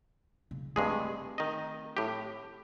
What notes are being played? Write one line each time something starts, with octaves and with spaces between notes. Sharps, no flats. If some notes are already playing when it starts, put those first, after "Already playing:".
C#3
G2 G#3 A3 C4 G#4
D#3 D#5
A2 G4